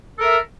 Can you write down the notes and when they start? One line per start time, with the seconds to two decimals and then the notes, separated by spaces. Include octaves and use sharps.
0.16 A4
0.20 A#4
0.24 E5